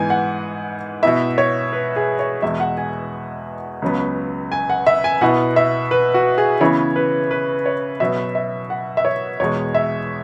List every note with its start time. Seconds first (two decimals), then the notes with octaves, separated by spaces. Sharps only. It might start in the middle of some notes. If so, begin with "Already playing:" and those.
Already playing: G#2 E3 B3 G#5
0.10 F#5
1.03 B2 B3 E4 E5
1.38 C#5
1.73 B4
1.96 G#4
2.19 C#5
2.42 E2 B2 G#3 E5
2.60 F#5
2.77 G#5
3.82 C#2 C#3 F#3 B3
4.52 G#5
4.70 F#5
4.87 E5
5.04 G#5
5.21 B2 B3 E4 F#5
5.56 E5
5.91 B4
6.14 F#4
6.38 G#4
6.61 C#3 E3 B3 E4 C#5
6.96 B4
7.31 B4
7.66 C#5
8.00 B2 F#3 B3 E5
8.35 E5
8.70 F#5
8.97 E5
9.05 C#5
9.40 E2 B2 G#3 C#5
9.75 E5